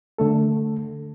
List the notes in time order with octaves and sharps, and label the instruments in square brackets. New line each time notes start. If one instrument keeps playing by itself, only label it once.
[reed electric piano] D3 A3 A4